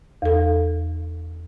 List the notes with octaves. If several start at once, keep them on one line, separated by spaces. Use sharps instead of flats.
E2 A4